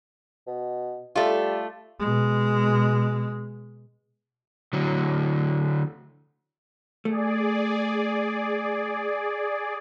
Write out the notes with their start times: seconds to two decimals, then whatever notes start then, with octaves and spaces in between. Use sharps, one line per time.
0.47 B2
1.15 G3 A3 F4
2.00 B2 G#3
4.73 D3 F#3
7.05 A3 G#4 D5